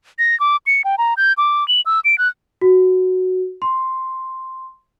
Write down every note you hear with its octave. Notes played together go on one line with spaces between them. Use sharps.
A#6
D6
C#7
G5
A#5
G6
D6
F#7
E6
D7
F#6
F#4
C6